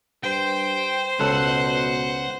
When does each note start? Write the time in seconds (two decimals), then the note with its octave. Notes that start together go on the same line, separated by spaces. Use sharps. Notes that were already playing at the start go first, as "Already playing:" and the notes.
0.23 G2 C5 G5
1.20 C#2 B2 A4 F#5